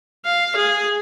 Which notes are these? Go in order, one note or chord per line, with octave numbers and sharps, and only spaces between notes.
F5
G#4